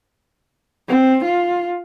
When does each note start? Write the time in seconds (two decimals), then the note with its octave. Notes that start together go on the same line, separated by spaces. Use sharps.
0.88 C4
1.25 F4